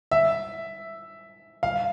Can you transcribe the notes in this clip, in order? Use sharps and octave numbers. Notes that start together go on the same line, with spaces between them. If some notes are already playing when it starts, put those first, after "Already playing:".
E5
F5